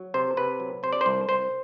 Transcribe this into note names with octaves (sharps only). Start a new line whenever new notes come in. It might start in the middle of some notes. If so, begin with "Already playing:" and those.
Already playing: F#3
C3 C5
C3 B4
F#3
C3 C5
D5
C5
C2
C2 C5